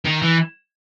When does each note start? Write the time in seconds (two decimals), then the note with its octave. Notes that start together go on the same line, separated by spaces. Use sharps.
0.05 D#3
0.22 E3